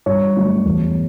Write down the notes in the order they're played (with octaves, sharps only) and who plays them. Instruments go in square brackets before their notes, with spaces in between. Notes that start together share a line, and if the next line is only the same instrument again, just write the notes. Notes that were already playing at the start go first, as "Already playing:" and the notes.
[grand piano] G2 C#5
D3 F#3 A3 D4
E2